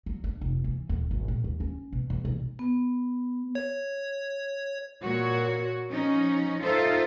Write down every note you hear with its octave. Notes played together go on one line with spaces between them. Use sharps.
F#3
D4
F1
E3
D#1
G#1
A#2
D#2
C#4
B2
E2
B1
B3
C#5
A#2 F#4 C#5
F3 C#4 D#4
D#4 F4 A4 C5 E5